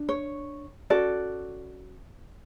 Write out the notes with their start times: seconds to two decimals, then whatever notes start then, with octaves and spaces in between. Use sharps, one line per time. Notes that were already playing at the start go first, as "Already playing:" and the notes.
Already playing: D4
0.09 C#5
0.90 C#4 F#4 A4 D5